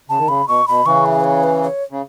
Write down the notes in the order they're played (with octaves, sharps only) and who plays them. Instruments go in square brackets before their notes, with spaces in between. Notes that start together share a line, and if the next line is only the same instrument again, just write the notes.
[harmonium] C#3 [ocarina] A5
[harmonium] D#3
[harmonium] C#3 [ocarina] B5
[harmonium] B2 [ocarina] C#6
[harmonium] B2 [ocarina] B5
[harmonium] C#3 E3 [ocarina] C#6
[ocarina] E5
B4
C#5
B4
C#5
[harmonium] C#3